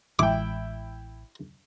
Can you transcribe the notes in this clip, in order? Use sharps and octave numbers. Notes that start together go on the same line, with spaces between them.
A1 E3 G#3 E4 G5 D6